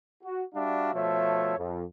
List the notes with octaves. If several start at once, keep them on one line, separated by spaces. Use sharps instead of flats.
F#4
G3 D4 F#4 E5 F5
B2 F3 A3 C#5 E5
F2